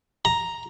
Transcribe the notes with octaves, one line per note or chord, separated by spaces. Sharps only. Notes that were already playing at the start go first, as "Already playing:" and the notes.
A#5